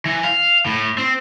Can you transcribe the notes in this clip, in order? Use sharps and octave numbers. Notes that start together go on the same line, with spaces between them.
E3
F5
A2
C4